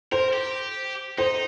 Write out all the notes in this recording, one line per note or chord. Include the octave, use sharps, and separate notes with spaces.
A#4 C5
G4
D#4 C5